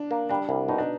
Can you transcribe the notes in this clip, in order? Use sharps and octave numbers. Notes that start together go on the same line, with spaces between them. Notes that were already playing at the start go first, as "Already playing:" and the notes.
Already playing: D4
A#3
G3 D4
C2
B2 D#4
D4